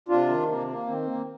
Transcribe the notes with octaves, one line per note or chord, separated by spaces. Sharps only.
C3 D4 F4
D#3
C3 A#3
A#3
D#3 C4
A#3